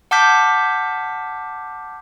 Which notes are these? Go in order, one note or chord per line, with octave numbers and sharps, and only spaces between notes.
F#5 A5 D6 F6 G6 B6